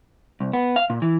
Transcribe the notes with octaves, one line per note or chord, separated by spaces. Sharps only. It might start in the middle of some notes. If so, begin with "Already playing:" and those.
C2
B3
F5
A#2
E3